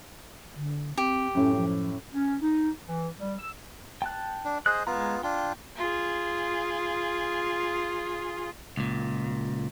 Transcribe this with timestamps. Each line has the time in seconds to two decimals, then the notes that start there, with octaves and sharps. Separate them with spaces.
0.56 D3
0.97 C4 G4
1.35 F#2 A2 C#4
1.56 F3
2.13 C#4
2.41 D#4
2.86 E3
3.19 G3
3.37 E6
4.02 G5 A5 F#6
4.45 D4
4.66 G#4 C5 D#5 F#6
4.87 G#3 B3 F4 A#5
5.23 D4 F4 G5
5.77 F4 G#4
8.77 C#2 A#2